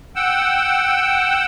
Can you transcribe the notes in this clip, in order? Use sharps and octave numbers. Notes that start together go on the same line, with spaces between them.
F#5 G5 E6